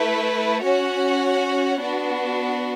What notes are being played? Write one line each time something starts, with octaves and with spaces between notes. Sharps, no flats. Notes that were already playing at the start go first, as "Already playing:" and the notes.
Already playing: A3 E4 B4
C#4 F#4 C#5 F#5
B3 D4 F#4